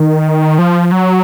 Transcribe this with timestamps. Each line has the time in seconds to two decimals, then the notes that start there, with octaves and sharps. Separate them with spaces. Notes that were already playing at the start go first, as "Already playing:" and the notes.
Already playing: D#3
0.59 F3
0.92 F#3